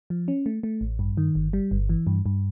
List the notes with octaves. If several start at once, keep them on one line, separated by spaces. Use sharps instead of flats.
F3
C#4
A3
A3
A1
G2
D#3
G1
G3
G1
E3
G2
G2